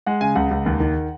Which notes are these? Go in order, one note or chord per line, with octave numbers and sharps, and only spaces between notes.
G#3 F#5
C#3 G#5
C#2 F#5
C#2
D#2
D#3